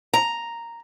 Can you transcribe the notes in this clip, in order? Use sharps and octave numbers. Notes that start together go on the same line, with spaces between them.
A#5